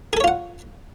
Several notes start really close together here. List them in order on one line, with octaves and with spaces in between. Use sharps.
G#4 A4 C#5 F4 F#5